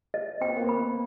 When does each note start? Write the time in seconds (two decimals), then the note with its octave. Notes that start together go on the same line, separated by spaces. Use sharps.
0.14 D#5
0.41 C4 G5
0.48 B3
0.57 A#3
0.64 B3 B5